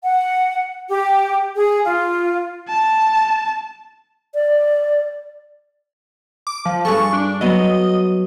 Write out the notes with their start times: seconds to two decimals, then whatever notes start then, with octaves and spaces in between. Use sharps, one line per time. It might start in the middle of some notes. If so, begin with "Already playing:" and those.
0.03 F#5
0.89 G4
1.55 G#4
1.84 F4
2.69 A5
4.35 D5
6.47 D6
6.65 F3
6.85 G2 G#4 A4 C#6
7.13 D4
7.41 F#3 B3 D#5